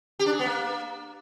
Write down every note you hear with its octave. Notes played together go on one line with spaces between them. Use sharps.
G4
D4
G#4
B3
A#3